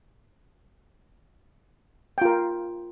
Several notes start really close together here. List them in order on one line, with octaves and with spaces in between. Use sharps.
G5 F4 A#4